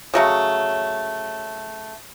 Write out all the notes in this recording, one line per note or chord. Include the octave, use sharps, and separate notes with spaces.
C#3 F#3 A3